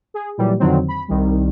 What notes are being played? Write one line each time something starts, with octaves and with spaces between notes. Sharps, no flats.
G#4
A#2 E3 F#3 G3
F2 D3 D#3 F#3 C4
B5
C2 D#3 G3